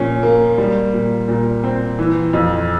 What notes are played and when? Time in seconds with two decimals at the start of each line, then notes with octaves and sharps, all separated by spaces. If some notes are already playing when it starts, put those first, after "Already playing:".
Already playing: A#2 F3 C#4
0.23 A#3
0.58 G3
0.93 A#2
1.28 A#2
1.64 C4
1.99 E3
2.33 F2